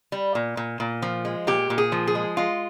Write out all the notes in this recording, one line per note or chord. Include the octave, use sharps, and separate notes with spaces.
G3
A#2
A#2
A#2
F3
G#3
A#2 G4
A#2
G#4
F3
G#4
G#3
G#3 F4